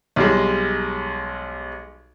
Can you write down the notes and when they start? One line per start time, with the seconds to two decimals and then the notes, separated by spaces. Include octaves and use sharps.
0.16 B1 G3 G#3